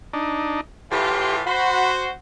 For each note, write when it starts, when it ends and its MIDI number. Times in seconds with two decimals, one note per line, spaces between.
0.13 0.61 62
0.13 0.61 63
0.92 1.41 45
0.92 1.41 52
0.92 1.41 65
0.92 1.36 67
0.92 1.36 84
1.47 2.10 66
1.47 2.10 72
1.47 1.91 83